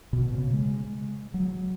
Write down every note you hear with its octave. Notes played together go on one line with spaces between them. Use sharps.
B2
C#3
G#3
F#3